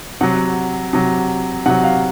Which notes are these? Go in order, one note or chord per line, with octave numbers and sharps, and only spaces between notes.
C3 F#3 F#5
C3 F#3
C3 F#3 F#5
F5